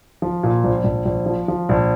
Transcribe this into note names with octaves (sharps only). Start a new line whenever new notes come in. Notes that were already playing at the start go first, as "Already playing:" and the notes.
F3
A#2
A#1
A#1
A#1
F3
F3
A#1